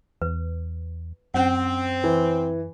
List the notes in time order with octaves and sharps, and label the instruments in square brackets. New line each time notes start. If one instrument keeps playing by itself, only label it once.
[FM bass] E2 [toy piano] B4
[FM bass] F#2 [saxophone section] C4 [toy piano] C#4 F#5
[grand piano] E3